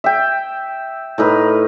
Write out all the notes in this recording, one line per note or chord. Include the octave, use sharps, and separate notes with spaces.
E5 G5
A2 D#4 A#4 B4